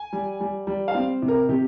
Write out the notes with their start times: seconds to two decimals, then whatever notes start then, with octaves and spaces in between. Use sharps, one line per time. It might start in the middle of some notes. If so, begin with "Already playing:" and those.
Already playing: G#5
0.13 G3
0.40 G3
0.67 G3
0.88 F5
0.95 C4
1.22 C3
1.28 A#4
1.49 C3 G4